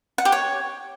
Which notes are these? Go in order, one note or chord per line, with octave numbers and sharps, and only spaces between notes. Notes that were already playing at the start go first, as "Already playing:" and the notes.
F#5
G4
C#5